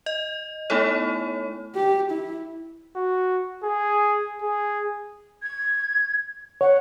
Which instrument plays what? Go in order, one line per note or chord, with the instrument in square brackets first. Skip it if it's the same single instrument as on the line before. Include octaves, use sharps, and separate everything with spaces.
[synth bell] D#5
A3 B3 D#4 E4 A4 C#5
[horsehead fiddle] G4
E4
[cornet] F#4
G#4
G#4
[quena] G#6
[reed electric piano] C#5 [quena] F#5